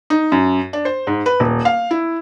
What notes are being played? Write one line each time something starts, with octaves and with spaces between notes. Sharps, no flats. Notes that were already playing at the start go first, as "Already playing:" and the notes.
D#4
F#2
D4
C5
G#2
B4
D#1
F5
E4